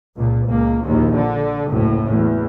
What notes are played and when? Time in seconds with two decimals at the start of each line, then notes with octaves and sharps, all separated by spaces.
0.16 C#2 A#2
0.46 C#2 A#3
0.84 A#1 D#2
1.15 D3
1.68 F#1 D2 A2
2.10 E2